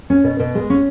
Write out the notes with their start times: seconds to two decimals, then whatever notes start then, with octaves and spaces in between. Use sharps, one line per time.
0.10 C#4
0.24 B2
0.40 B2
0.55 G#3
0.70 C#4